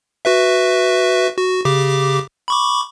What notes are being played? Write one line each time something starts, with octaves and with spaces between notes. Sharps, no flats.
F#4 B4 E5
F#4
C#3 G4 D6
B5 C#6 D6